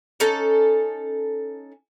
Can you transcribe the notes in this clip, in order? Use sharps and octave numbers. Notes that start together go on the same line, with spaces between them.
C#4 D#4 A4